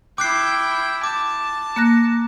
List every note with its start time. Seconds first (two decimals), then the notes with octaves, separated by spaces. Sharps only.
0.18 E4 G5 D6 F#6 C7
1.04 A5 D6
1.76 A#3 F#6 A#6